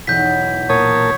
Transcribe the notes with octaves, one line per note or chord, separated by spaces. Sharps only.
B1 E2 G6 B6
A#2 A#4 C#5 A5 D#6